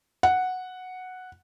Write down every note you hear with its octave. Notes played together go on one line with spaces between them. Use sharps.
F#5